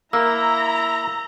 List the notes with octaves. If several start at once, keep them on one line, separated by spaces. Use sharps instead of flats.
A#3 E4 A#5 E6